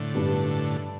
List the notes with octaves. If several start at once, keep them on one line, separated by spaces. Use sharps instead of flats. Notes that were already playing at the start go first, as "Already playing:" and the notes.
Already playing: A2 D3
G2 G3 D4